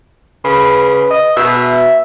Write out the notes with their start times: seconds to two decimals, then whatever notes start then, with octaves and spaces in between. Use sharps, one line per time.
0.44 C#3 B4
1.11 D#5
1.36 B2 E5